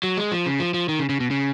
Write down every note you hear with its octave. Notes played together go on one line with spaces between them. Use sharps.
F#3
G#3
F3
C#3
F3
F3
D#3
C#3
C#3
B2
C#3